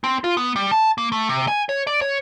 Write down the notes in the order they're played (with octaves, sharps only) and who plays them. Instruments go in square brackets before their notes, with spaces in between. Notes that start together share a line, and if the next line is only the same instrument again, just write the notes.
[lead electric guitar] C4
F4
B3
G3
A5
A#3
A3
C3
G#5
C#5
D5
C#5